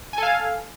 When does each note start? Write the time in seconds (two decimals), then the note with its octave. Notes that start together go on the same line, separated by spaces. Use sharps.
0.13 G#5
0.18 A4
0.23 F5